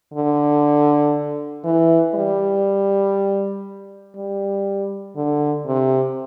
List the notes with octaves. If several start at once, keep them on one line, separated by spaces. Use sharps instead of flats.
D3
E3
G3
G3
D3
C3